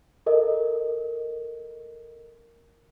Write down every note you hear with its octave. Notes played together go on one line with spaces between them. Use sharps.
A4 A#4 D#5